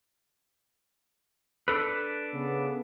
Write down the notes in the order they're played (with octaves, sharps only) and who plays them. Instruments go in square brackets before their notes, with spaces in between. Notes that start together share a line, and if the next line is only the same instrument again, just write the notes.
[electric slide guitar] D4 A4 B4
[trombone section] C#3 B3